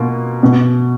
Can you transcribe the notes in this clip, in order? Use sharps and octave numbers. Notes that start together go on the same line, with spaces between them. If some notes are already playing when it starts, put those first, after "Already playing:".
Already playing: B2 A#3 F4
B2